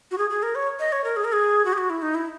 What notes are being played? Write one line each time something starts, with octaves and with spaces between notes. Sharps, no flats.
F#4
G#4
G#4
A#4
C#5
D#5
C#5
A#4
G#4
A#4
G#4
F#4
G#4
F#4
E4
D#4
E4